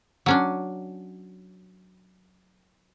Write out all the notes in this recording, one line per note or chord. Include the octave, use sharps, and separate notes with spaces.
F#3 C#4 D4